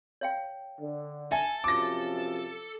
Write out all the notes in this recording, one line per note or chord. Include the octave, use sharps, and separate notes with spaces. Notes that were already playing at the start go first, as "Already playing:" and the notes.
C#5 F5 G5
D3
A4 E5 G#5
F#2 C3 F3 D6 A#6